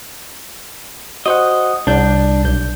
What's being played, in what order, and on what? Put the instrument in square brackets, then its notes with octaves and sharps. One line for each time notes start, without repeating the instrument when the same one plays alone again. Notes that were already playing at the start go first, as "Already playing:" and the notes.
[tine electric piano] F#4 C5 F#5 [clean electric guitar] D#5
[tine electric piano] C2 G6 [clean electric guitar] D4
[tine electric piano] B1 G6